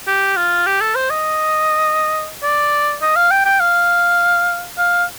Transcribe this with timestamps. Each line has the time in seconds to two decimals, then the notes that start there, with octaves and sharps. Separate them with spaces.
0.07 G4
0.36 F4
0.66 G4
0.81 A4
0.95 C5
1.10 D#5
2.43 D5
3.01 D#5
3.16 F5
3.31 G5
3.45 G5
3.60 F5
4.78 F5